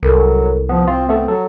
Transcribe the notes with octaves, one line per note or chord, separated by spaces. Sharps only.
C2 F#3 A4 A#4
F3 B3 D#6
C4 F4
A3 B3 C4 A4
F#3 A4